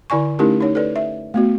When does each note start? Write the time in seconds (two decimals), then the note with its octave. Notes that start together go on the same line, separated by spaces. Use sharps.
0.10 D3 E4 D5 G#5 C#6
0.39 A3 C#4 D#4 E4 G4 A#4
0.60 D#4 C#5
0.75 A4 B4 D5
0.96 E5
1.34 A3 B3 F#4